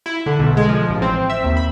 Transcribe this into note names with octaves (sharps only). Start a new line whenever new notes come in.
E4
D3
B1
G#3
F3
A1
C4
E5
D#2
B5